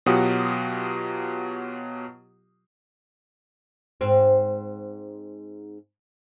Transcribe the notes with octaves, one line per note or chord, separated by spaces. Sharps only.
B2 F#3 F4 G4 F#5 D#6
G#2 C4